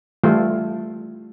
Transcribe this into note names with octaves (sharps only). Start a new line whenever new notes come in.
E3 G3 A3 F4